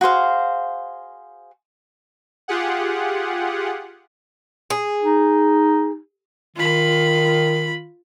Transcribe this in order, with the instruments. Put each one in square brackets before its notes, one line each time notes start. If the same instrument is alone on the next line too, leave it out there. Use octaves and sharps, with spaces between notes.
[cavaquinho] F#4 G#4 C5 F5
[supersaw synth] F4 G4 G#4 F#5
[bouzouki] G#4
[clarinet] D#4
[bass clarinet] D#3 [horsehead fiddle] F4 B5